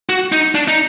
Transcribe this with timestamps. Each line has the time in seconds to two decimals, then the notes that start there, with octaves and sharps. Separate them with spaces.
0.09 F#4
0.32 D#4
0.55 D4
0.68 D#4